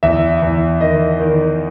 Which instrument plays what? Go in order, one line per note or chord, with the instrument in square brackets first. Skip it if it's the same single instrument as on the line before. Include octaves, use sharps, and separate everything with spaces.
[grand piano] E2 E5
E2
D#3 D#5
D#3